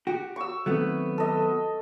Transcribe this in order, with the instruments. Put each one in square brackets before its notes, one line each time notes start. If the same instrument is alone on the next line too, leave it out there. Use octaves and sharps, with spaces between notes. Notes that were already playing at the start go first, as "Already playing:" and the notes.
[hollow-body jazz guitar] F#4 G4
[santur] C#6 E6
[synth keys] D#3 C4 [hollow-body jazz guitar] F#3 A3 B3
[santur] A4 D#5